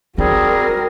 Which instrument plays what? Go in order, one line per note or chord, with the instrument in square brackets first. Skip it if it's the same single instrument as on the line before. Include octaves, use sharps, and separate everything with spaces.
[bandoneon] G3 C4 [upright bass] D#4 [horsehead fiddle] F#4 A#4 [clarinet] G#4